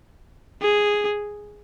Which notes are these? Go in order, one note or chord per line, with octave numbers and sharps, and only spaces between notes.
G#4